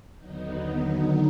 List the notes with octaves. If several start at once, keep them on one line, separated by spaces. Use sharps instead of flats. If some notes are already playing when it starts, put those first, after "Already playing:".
D#2 D3 F#3 B3 D#4